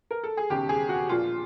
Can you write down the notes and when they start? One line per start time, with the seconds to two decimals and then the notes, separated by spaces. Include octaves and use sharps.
0.11 A#4
0.23 A4
0.37 G#4
0.50 E1 D#2 C#3 G4
0.69 G#4
0.89 F#4
1.09 A#1 A#2 F4